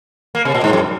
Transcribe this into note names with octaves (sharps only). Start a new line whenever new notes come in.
A#3
C3
A#2
G#2
F#2